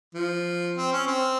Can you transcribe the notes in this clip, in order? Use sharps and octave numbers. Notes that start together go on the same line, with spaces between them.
F3
C4
C#4
C4